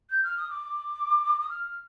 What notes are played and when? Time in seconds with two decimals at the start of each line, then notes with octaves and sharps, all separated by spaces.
0.09 G6
0.23 F6
0.37 D#6
0.50 D6
1.40 D#6
1.49 F6